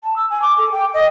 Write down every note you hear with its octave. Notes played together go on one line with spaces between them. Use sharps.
A5
E6
G#5
D6
A4
G5
D#5